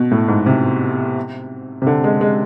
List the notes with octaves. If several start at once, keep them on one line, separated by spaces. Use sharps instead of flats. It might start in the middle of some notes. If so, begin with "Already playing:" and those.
Already playing: B2
A2
G#2
C3
C3
D3
G#3
G#3